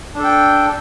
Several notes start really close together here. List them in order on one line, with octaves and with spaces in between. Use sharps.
D4 A4 G5